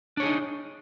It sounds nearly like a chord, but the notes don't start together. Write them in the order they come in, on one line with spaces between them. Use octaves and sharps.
D4 C#5 G#4 D#4